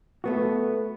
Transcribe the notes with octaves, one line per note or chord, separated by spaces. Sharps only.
A3 B3 F#4